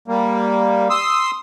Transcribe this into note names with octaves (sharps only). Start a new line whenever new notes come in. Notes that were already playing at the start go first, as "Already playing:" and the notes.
G3 A#3
C6 D#6 E6